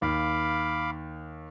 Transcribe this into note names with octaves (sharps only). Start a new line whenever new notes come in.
D#2 F5 B5 D6